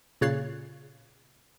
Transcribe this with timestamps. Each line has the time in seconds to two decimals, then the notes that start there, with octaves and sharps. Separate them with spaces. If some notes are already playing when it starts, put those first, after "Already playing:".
0.21 A#2 C#3 C#5 F#6 A6 C7